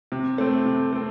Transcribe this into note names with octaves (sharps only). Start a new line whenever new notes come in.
C3
A3 C4
C3
A3 C4